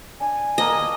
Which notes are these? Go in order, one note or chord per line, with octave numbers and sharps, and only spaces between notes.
D4 G#5
A#3 D#5 A5 E6